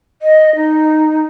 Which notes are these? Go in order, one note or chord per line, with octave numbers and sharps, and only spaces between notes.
D#5
D#4